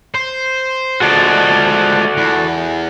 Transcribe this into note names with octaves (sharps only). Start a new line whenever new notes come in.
C5
F3 G#3 F#4 A4 D5
E2